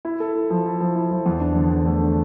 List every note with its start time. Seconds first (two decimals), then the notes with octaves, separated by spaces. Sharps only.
0.05 E4
0.20 A4
0.35 E4
0.50 F3
0.65 E4
0.80 F3
0.96 E4
1.11 F3
1.26 E2
1.40 D4
1.56 D3
1.71 E2
1.86 A3
2.02 D4